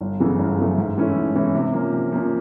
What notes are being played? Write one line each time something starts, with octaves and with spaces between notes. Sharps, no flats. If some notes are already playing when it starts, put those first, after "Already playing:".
G1
F#2 C#3 E3 A3
G1
F#2 C#3 E3 A3
G#2
E3 A3 C#4 E4
G#2
E3 A3 C#4 E4
C3
F3 A#3 C#4
C3
F3 A#3 C#4